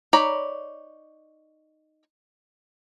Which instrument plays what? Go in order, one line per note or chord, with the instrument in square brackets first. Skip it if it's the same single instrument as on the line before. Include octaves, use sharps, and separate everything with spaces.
[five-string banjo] D#4 C#5 D5 A#5 B5